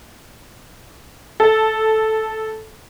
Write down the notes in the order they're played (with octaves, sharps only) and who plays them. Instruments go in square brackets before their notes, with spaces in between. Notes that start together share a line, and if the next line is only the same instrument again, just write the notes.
[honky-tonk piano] A4